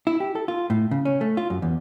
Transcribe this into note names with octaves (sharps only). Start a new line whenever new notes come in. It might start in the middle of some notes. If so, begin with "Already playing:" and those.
E4
G4
A4
F4
A2
C#3
C#4
A3
F4
F#2
E2